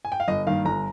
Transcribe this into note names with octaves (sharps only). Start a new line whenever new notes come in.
G#5
G5
F5
G1 D#5
G2 D#3 A#3 F5
G1 A#5